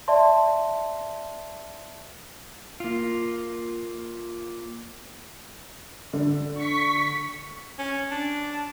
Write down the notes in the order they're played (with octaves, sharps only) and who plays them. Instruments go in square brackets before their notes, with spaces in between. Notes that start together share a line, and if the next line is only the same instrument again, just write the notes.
[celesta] D5 E5 A5 C6
[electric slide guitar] A#3 F4
[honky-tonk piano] D3
[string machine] C#6 B6
[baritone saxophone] C#4
D4